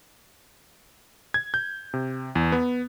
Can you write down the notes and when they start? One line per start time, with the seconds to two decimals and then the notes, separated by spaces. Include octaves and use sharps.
1.34 G#6
1.54 G6
1.94 C3
2.35 E2
2.52 B3